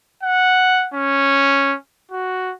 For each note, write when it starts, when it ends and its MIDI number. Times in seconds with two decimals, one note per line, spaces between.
0.23 0.87 78
0.94 1.75 61
2.12 2.53 66